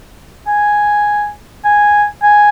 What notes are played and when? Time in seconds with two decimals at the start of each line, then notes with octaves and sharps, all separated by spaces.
0.47 G#5
1.64 G#5
2.22 G#5